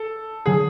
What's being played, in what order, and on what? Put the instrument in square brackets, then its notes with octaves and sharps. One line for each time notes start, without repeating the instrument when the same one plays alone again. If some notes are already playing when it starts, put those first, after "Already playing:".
Already playing: [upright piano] A4
[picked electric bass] D3 F#3 [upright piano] G#4